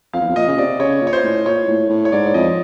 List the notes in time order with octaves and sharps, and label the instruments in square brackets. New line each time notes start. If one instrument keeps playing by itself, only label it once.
[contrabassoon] F2 [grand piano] F5
[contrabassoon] E2
F2
[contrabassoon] A#2 [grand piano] D#5
[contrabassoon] C#3
[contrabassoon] C3 [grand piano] D5
[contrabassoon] C#3 [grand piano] C#5
[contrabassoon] A#2
[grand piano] C#5
C5
[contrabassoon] A2
[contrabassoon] A#2 [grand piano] C#5
[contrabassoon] A2
A2
[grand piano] C#5
[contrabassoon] G#2 [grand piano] D5
[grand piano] D5
[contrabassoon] F2 [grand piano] D#5